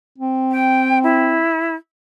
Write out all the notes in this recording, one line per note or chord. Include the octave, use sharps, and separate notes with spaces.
C4
G5
E4